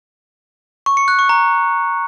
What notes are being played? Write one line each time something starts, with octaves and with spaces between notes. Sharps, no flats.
C#6
C#7
F#6
C#6
A#5